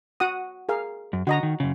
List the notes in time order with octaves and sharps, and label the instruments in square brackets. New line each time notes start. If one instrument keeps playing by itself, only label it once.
[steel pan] F#4 F#5 D#6
G#4 A#4 F5
[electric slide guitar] F#2
[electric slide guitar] D3 [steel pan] F#4 D#5 A#5
[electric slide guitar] D#3
F#2 C#3